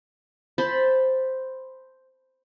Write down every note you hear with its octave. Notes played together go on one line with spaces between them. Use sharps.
C5 A5 B5 C6